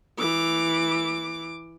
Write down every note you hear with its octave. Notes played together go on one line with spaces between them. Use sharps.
E3 D6